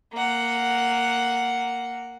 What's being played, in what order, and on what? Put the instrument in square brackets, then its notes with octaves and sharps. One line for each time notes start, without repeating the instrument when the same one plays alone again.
[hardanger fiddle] A#3 F#5